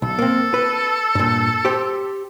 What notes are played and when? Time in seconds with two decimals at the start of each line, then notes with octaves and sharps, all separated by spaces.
0.02 B1 A4
0.19 A#3 C4
0.54 B4
1.15 G2 A#2
1.65 G4 C5